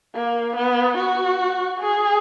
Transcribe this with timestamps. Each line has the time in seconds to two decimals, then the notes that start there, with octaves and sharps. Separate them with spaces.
0.15 A#3
0.56 B3
0.97 F#4
1.80 G#4